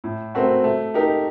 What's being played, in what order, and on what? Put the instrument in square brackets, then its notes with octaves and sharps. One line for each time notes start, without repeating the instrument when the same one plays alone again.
[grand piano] A2
A3 C4 F#4 A#4
A3
D#4 G4 A#4